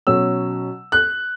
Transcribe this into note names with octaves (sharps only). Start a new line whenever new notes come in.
B2 F#3 C#4 E6
F#6